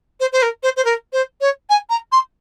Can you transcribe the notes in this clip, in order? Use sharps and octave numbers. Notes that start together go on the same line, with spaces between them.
C5
C5
A#4
C5
C5
A#4
C5
C#5
G#5
A#5
C6